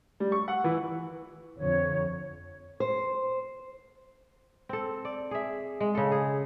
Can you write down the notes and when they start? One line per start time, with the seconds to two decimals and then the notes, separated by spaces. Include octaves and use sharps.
0.20 G3
0.32 C#6
0.48 F#5
0.64 E3
1.59 F2 D3 C#5
2.80 C5
4.69 C4 A4
5.05 D5
5.31 G#4 E5
5.80 G#3
5.95 C#3 A4
6.12 G#4